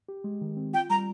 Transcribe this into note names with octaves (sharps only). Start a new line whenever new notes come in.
G4
G#3
D#3
C4
F4 G5
G3 A#5